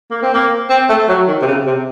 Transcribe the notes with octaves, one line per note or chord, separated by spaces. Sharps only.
A#3
C4
A#3
C4
A3
F#3
D#3
C3
C#3
C3